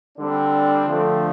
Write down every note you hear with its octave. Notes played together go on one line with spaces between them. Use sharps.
D3 G3 C4 D4
D3 F3 A3 C4